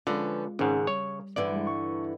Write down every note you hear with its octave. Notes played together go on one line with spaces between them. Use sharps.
D3 F3 G#3 C#4 F4 B4
G#1 G#2 C#3 C#4
G3 C#5
G2 D3 E3 D5
G3 G#3
C#6